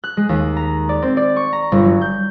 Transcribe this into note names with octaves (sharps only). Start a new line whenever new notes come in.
F#6
G#3
D#2
A#5
D5
C4
D5
C#6
A#5
G1
F#3
G6